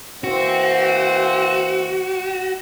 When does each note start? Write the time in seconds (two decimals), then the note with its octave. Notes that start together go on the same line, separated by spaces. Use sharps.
0.24 E3 A#3 C4 F#4